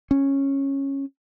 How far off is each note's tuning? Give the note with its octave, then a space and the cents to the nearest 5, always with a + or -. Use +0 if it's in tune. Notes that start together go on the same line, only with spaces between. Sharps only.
C#4 -10